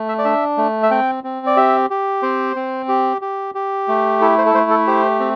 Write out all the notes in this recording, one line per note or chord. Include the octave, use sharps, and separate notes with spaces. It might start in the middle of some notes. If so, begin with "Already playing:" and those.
Already playing: A3
E5
D5
D4 E5
A3
E5
C4 G5
C4
D5
G4 E5
G4
C4 C5
C4
G4
G4
G4
A3
E4 A4
C5
A4
A3 C5
A4
G4 C5
C4